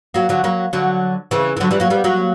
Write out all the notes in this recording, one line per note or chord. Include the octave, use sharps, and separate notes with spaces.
F#3 A#3
D3 F#3
F#3 A#3
D3 F#3
C#3 E3
E3
D3 F#3
E3 G3
F#3 A#3
G3 B3
F#3 A#3